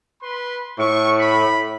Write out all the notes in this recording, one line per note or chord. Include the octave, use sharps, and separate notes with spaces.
B4 B5 C6
A2 C#6
B5